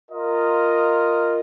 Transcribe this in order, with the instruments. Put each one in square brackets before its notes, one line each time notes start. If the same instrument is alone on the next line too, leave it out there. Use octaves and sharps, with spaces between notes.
[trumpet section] F4 A#4 D#5